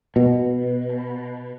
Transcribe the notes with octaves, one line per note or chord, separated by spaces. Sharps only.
B2